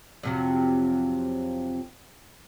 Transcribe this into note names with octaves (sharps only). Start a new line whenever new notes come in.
F2 C3 F#3